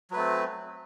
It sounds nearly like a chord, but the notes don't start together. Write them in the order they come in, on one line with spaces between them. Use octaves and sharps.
F#3 B4 A3 C4